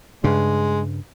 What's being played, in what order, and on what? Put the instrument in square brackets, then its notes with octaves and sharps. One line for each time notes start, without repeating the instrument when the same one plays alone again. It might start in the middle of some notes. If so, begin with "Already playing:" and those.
[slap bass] G2 C#3 [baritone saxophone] G#3